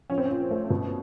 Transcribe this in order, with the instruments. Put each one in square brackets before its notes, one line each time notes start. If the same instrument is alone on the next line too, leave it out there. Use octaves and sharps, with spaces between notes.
[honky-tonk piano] F3 C#4
C4
C#4
A#2
A3
B2